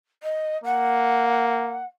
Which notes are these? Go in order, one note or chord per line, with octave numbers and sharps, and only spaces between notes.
D#5
A#3 F#5